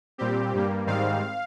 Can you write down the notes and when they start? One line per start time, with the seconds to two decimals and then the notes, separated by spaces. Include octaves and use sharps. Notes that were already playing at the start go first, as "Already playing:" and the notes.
0.18 A#2 G3 C4 G4
0.53 G2 G3 A#3
0.87 G#2 D#3 G3 C4 F5